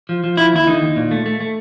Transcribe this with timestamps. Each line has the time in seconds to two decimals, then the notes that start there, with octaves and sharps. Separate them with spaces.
0.09 F3
0.24 F3
0.37 F3 E4
0.53 D#2 E4
0.67 D3 D#4
0.82 D#2
0.96 A#2
1.11 A3
1.26 A3
1.40 A3